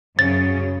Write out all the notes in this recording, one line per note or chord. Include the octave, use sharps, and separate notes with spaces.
F#2 C#3 C#4 A6